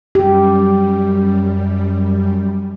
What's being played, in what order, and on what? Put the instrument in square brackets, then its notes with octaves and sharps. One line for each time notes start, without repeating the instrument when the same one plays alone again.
[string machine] F#2 G3 [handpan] G4